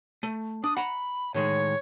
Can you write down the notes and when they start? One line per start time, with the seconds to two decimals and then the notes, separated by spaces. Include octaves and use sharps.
0.23 A3
0.64 D4 D#6
0.77 F#5 A#5 B5
1.34 A2 D#3 G#3 C#5